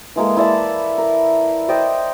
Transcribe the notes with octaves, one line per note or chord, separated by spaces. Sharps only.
E3 G#3 A#3 A4
E4 D5 A5
A#4
C5 D5 D#5 G5